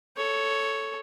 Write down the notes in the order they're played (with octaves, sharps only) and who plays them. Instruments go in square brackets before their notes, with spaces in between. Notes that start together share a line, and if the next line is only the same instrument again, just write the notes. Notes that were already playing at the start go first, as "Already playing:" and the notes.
[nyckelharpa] A4 C#5